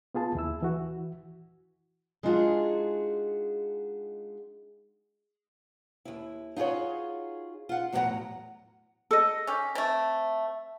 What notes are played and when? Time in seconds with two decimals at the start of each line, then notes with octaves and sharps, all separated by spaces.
0.14 B3 F4 G#4 A5
0.35 D#2 E4 E6
0.62 E3 F#4
2.23 G#3 D4 D#4 F4 F#4 G#4
6.05 D#2 E4
6.56 D#4 F4 F#4 G#4 C#5
7.69 F4 F#5
7.92 E2 A2 F#3 F#4 F#5 A#5
9.11 A4 D#5
9.47 C#4 G4
9.75 A3 C4